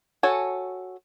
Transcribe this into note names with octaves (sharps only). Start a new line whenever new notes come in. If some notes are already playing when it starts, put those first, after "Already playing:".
F#4 A4 C#5 G#5